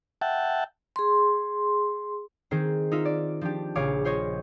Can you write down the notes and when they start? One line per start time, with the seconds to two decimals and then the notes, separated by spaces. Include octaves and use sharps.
0.22 E5 F#5 G5 A5
0.96 G#4 C6
2.51 D#3 C4 G#4 C5
2.91 D#4 F4 E5
3.05 D5
3.41 F3 D4 G4
3.75 A#1 C#3 G#4 C#5 F5 D6
4.05 F4 C5 C#5 D#5